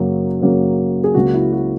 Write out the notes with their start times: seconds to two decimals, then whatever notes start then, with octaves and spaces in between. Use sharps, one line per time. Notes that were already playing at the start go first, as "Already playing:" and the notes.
Already playing: F#2 C#3 F#3 A#3
0.41 F#2 C#3 F#3 A#3
1.04 G#4
1.14 C#2 C#3 F#3 A#3 F#4
1.33 E4
1.52 F#4